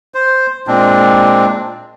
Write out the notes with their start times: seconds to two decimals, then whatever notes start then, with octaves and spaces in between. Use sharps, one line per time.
0.14 C5
0.68 A#2 G#3 C4 D4